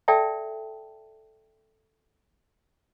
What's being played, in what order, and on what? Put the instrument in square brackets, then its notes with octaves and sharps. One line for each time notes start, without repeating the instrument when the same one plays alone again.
[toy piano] A4 D5 E5 G5 A5